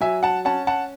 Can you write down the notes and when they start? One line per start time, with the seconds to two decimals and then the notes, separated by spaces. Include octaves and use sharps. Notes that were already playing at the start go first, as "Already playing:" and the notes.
0.01 F#3 E5 G#5
0.23 F#5 A5
0.45 C#4 F#5 A5
0.67 F#5 A5